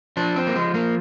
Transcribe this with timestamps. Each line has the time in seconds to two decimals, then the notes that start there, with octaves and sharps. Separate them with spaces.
0.17 F3 D4
0.36 C4
0.47 A#3
0.55 F3 G#3
0.74 A#3